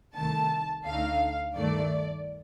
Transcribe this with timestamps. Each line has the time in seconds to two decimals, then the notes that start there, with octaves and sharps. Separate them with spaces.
0.16 C2 C3 D#3 A3 A5
0.86 D2 D3 A3 D#4 F5
1.55 G2 D#3 A3 D5